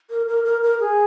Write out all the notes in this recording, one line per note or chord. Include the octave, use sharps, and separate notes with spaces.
A#4
A#4
A#4
A#4
G#4